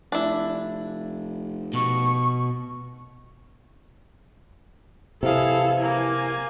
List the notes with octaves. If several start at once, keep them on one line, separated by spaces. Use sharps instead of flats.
F1 D4 E4
B2 C#6
C3 E3 F3 B3 E4 G#4 A4 F5
A#3 G#5